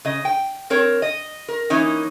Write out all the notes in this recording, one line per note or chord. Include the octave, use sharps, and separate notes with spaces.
C#3 D#5
G5
C4 A#4 C#5
D#5
A#4
E3 A#3 C#4 D#4